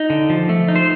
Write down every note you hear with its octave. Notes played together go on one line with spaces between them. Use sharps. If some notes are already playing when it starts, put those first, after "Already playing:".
Already playing: D#4
D3
F3
A3
D#4
C5